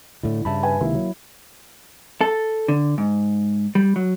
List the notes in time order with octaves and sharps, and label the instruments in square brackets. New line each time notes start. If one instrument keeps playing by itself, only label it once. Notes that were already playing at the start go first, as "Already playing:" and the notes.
[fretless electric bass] A2 D3 [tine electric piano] E4
[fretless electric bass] G2 C#3 [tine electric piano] E5 A5 B5
[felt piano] B4 G#5
[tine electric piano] C#2 C3 D#3 [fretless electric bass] A#3 [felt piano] E4
[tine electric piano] F#3
[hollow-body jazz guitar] A4
D3
G#2
G3
F#3